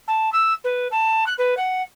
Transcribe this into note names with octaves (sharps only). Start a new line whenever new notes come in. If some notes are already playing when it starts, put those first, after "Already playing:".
A5
E6
B4
A5
F#6
B4
F#5